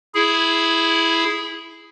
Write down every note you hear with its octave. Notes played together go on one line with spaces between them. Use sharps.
E4 G#4